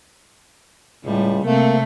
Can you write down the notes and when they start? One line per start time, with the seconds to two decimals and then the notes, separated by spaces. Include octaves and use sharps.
1.05 C#2 A2 G3
1.44 C3 A3 A#3 C4